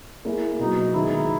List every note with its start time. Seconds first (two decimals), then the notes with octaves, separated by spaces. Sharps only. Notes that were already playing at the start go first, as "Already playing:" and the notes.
0.25 A#3 E4 G#4
0.59 B2 F#3 B3 D#4 F#4
0.94 D#3 G#3 D#4 E4